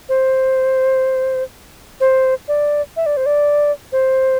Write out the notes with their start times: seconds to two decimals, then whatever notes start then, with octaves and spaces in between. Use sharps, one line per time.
0.09 C5
2.00 C5
2.48 D5
2.97 E5
3.06 D5
3.17 C5
3.26 D5
3.92 C5